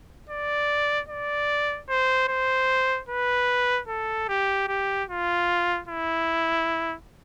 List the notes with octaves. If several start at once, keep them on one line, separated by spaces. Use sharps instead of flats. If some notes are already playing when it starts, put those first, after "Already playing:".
D5
D5
C5
C5
B4
A4
G4
G4
F4
E4